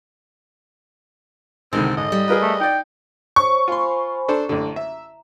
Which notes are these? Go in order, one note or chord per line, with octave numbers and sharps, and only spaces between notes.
C2 D3 D#3 G#3 C4
G#2 D#5
G3
G#4 A#4 B4
A3
D#4 D5 G5
C5 C#5 C#6
F4 C5 G#5 B5 C6
D4 A4 C5 A#5
A1 D3
E5